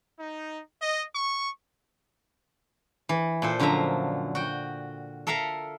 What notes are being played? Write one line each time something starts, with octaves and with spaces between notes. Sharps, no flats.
D#4
D#5
C#6
E3
A#2 A4 C5
F#2 D3 F3 F#3 E5 A#5
F#4 G5
A4 A#4 E5 F5 A#5